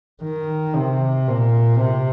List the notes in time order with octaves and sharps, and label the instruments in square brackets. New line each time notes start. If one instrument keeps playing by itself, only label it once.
[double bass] D#3
C3
A#2
C3